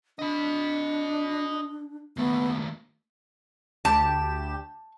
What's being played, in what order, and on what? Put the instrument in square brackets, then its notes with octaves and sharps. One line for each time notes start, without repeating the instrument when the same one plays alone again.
[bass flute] D4 [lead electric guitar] D#5 B5
[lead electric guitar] D#2 A3 [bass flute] B3
[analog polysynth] D2 G4 E7 [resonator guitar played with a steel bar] A5